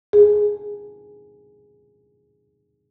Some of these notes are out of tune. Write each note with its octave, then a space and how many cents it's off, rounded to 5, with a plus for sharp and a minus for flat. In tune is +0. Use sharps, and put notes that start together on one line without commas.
G#4 -5